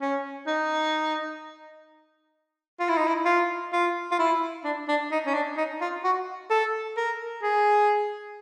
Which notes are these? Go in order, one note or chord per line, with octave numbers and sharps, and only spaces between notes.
C#4
D#4
F4
E4
D#4
E4
F4
F4
F4
E4
D4
D4
D#4
C#4
D4
D#4
F4
F#4
A4
A#4
G#4